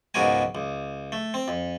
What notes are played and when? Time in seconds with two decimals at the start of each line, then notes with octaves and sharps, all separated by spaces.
0.14 C#2 G#2 B2 F#4 A#4 G#5
0.55 C#2
1.12 A3
1.34 C4
1.48 F2